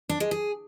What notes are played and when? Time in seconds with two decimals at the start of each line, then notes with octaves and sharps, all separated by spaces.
0.09 D4
0.20 G#3
0.31 G#4